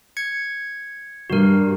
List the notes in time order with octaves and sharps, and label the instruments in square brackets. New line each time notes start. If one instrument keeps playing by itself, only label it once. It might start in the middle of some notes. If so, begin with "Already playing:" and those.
[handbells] G#6 C#7
[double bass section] G2 [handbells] F#4 A#4